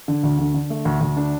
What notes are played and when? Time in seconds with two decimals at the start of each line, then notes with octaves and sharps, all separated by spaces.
0.08 D3
0.23 D2
0.39 D3
0.55 D3
0.70 A3
0.85 D2
1.01 D2
1.17 D4